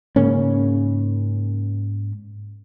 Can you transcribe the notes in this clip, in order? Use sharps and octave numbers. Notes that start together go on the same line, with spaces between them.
G#2 C#3 A#3 C#4